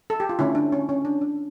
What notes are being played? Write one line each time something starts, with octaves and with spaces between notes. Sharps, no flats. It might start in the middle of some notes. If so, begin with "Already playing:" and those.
A4
G4
F4
D3 A3 C#4 E4
D4
C#4
C#4
D4
D4